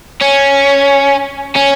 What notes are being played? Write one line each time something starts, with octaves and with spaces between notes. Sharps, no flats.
C#4
C#4